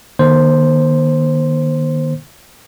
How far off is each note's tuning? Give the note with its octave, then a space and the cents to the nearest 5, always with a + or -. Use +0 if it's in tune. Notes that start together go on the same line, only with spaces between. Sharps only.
D#3 -25 A#3 +45 C5 +0